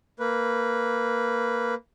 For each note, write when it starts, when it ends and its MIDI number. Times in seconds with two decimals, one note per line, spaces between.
0.20 1.75 58
0.20 1.75 71